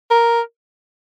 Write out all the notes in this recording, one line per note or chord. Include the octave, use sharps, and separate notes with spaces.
A#4